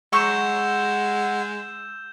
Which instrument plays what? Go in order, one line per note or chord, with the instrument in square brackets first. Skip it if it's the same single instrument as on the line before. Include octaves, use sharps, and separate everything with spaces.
[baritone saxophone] G#3 [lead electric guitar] F#5 A#5 [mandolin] C#6 [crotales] E6 G6 E7